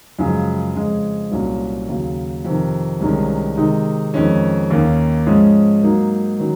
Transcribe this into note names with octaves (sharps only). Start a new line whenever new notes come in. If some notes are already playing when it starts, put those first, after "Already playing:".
F#2 C#3 F3 G#3
F2 C#3 G#3
C2 A#2 F#3 C#4
D#2 C#3 F#3
F2 C3 D#3
C2 C3 D#3 G#3 C#4
C3 D#3 G#3 D#4
F2 D#3 G#3 C#4
D#2 D#3 A#3 C#4
G#2 F3 G#3 C#4
G#2 F#3 A#3 D#4
D#3 F#3 C#4